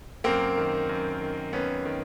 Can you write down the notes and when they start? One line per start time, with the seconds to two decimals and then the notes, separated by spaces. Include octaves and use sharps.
0.24 F#2 A#3 C4
0.57 D#3
0.89 F#2
1.21 D#3
1.53 F#2 B3 C#4
1.85 D#3